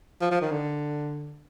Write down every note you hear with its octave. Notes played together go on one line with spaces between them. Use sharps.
F3
F3
D#3
D3